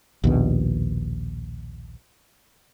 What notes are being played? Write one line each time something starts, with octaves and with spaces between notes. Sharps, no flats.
A#1 D#2 B2